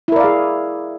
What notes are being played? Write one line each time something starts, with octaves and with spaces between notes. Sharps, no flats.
E4 G#4 A#4 D5 F5